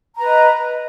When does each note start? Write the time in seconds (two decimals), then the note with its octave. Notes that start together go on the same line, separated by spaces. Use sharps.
0.16 A#5
0.20 B4
0.23 D#5